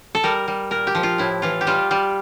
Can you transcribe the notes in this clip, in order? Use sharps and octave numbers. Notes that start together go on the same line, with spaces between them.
A4
G3 A#4
G3
A#2 A#4
G4
F3
F4
A2 E4
E3 F4
G4
G3 F4
G3